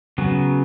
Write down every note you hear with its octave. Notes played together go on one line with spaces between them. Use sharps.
C#3 F#3 B3